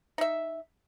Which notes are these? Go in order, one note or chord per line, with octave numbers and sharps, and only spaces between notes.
D#4 E5